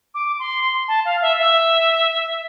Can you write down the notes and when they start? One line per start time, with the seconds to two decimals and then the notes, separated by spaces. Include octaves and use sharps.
0.15 D6
0.39 C6
0.88 A5
1.05 F5
1.22 E5
1.38 E5